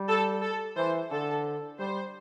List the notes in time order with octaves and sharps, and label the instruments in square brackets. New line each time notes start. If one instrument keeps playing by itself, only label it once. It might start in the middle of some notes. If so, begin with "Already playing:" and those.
Already playing: [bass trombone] G3
[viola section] A4
A4
[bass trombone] E3 [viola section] C5
[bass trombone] D3 [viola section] A4
[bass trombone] G3 [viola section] C5